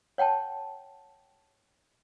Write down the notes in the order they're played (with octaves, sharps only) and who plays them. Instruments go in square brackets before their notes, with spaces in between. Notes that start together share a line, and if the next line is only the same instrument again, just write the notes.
[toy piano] C#5 F#5 G5 A5